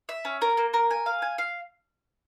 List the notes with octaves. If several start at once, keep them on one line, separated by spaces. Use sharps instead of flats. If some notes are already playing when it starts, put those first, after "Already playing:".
E5
C#4
A#4
A#3
A#4
G#5
F5
G#5
F5